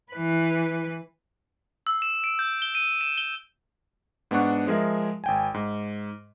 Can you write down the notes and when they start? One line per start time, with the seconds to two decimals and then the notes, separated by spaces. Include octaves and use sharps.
0.12 E3 B4
1.87 E6
2.02 E7
2.24 D7
2.39 G6
2.62 G7
2.75 D#7
3.01 E7
3.18 G7
4.31 G#2 B3 D4 F#5 C#6
4.67 F3 G#3 G#4 A#4 E5
5.24 G#1 G5 G#5
5.54 G#2